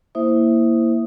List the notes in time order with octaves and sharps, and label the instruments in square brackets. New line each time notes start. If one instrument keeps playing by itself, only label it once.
[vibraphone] A#3 E4 C5 E5 D#6